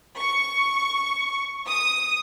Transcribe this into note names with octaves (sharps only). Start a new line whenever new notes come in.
C#6
D#6